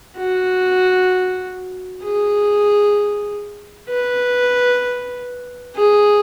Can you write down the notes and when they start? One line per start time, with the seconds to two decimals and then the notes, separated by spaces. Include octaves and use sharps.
0.18 F#4
2.04 G#4
3.89 B4
5.76 G#4